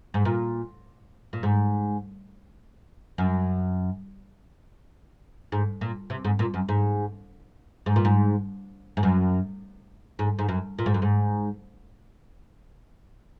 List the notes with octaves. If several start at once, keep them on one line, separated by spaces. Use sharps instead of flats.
G#2
A#2
A#2
G#2
F#2
G#2
A#2
C3
G#2
A#2
F#2
G#2
G#2
A#2
G#2
G#2
F#2
G#2
G#2
F#2
A#2
G#2
F#2
G#2